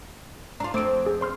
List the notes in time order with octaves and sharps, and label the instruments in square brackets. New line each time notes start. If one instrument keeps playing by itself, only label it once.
[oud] D4 F4 [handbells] A#5
[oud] F2 C4 [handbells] A3 D6 D7
[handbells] G#4
C5 C6 F6